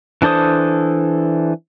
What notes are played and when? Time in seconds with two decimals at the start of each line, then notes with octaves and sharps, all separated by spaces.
0.22 E3 D4 A4 C5 D#6